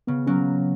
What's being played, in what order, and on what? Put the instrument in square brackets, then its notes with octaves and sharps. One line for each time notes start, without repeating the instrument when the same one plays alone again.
[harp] C#3 [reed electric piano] B3
[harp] F#3 A#3 [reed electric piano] C#4